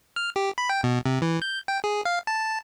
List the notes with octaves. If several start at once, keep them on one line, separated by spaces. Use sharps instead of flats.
F6
G4
B5
G5
B2
C3
E3
G6
G5
G#4
F5
A5